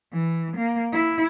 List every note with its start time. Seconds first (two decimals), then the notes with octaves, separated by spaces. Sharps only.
0.13 E3
0.56 A#3
0.92 E4